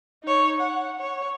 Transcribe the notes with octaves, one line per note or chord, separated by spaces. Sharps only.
D#4 C#5
F#5
C#5